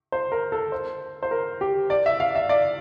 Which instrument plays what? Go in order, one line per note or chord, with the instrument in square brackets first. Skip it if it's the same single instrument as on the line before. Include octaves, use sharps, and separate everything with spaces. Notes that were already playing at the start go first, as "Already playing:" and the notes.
[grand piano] C5
A#4
A4
C5
C5
A#4
G4
D5
E5
F5
E5
D5